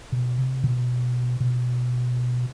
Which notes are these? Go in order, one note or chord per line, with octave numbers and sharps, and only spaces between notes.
B2
C3
B2
B2